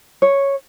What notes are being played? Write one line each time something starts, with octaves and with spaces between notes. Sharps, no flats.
C#5